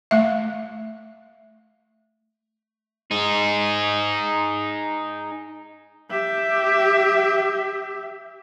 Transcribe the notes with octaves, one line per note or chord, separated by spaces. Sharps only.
A3 E5
D#4 G#4
G4 E5